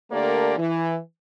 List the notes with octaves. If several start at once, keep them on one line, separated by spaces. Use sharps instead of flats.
D3 A3 A#3 G4 A#4 D5
E3